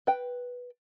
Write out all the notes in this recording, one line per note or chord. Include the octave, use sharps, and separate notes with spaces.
B4 G5